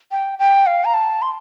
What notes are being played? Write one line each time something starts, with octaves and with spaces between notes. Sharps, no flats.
G5
G5
F5
A#5
A5
C6